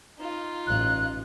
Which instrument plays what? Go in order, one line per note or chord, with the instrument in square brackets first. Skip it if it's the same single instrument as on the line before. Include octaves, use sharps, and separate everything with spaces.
[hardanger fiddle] D#4 F4
[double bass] A1 [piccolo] F#6